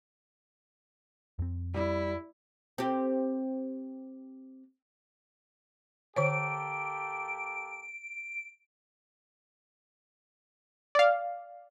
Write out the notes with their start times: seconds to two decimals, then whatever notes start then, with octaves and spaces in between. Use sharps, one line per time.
1.39 F2 C4
1.74 G3 E4
2.78 C4 G4
6.16 D3 A#3 G4 A4 C5 C#5 D7
10.95 D5 F5